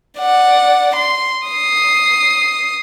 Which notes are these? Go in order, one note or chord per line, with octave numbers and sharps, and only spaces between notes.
D5 F#5
C6
D#6 C7